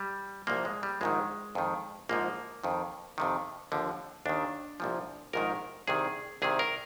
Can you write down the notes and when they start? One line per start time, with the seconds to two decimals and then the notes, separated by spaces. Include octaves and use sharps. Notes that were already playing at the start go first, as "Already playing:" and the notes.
Already playing: G3
0.47 C2 A#2 F3 A#3
0.65 G#3
0.83 G3
1.01 A#1 G#2 D#3 G#3
1.55 F2 D#3
2.09 A#1 G#2 F3 A#3
2.64 F2 D#3
3.18 F2 C3 D#3
3.72 D#2 D3 F3
4.26 D#2 D#3 D4
4.80 C2 A#2 F3
5.33 A#1 G#2 D#3 A#4
5.87 C2 C3 D#3 G#4
6.42 C2 C3 D#3 G#4
6.59 A#4